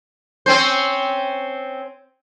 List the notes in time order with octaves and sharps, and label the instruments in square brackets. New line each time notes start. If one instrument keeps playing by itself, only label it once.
[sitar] C4 C#4 C5